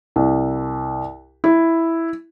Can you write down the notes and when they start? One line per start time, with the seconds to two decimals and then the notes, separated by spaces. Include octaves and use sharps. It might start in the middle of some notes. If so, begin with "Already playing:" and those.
0.16 C2
1.44 E4